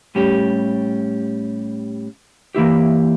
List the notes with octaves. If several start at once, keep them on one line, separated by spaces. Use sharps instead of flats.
A2 G3 C#4 G4
E3 A#3 E4 G4